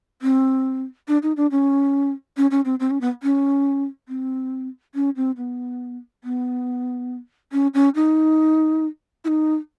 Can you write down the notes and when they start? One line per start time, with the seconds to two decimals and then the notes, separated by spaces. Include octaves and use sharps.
0.22 C4
1.08 D4
1.23 D#4
1.37 D4
1.51 C#4
2.37 C#4
2.51 C#4
2.65 C4
2.80 C4
2.91 C#4
3.01 B3
3.23 C#4
4.08 C4
4.95 C#4
5.16 C4
5.37 B3
6.24 B3
7.52 C#4
7.74 C#4
7.95 D#4
9.24 E4
9.28 D#4